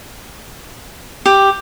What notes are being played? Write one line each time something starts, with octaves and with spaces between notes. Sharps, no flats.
G4